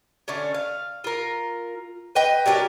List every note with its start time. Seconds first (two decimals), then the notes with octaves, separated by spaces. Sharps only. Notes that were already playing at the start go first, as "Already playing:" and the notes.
0.28 D3 A3 C#4
0.54 F5
1.04 F4 A#4
2.15 B4 D#5 G5
2.46 F#3 D4 G4 A#4